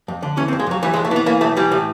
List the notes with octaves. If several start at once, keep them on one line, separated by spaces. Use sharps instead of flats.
F2
D3
E3 C#4
C4
F2
G#3
F2 F#3
E3 G3
G#3
F2
A3
E3 B3
E3 A#3
B1 A3
E3 G3
A2